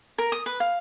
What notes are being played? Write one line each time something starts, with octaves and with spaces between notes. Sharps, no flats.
A#4
D#6
B4
F5